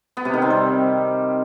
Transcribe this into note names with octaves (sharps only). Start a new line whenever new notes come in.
B3
C3
D#3
C4
G3